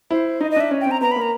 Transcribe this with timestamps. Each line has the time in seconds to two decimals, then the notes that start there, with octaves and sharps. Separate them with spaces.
0.11 E4 C5
0.41 D#4 D#5
0.51 D#5
0.56 D4 E5
0.71 C#4
0.81 G5
0.86 C4
0.91 A#5
1.01 B3 A#5
1.12 B5
1.16 A#3
1.22 A#5